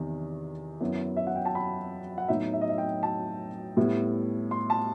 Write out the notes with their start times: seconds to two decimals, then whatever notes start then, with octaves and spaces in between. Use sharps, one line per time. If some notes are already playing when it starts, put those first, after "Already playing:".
Already playing: E2 C3 D#3
0.80 F#2 F#3 B3 E4
1.17 E5
1.27 F#5
1.36 G5
1.45 A5
1.55 B5
2.18 F#5
2.28 A2 F#3 B3 D#4 E5
2.53 E5
2.61 D#5
2.69 E5
2.78 G5
3.03 A5
3.77 A2 G3 B3 E4
4.51 C6
4.70 A5